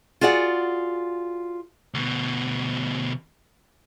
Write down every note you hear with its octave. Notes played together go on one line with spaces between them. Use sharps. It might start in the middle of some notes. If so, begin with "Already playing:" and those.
F4 F#4 G#4 D5 F#5
D2 B2